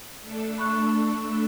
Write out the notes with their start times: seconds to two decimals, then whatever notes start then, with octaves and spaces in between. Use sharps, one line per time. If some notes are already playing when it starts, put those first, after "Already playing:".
0.21 A3 D4 A4
0.58 B5 C#6 F#6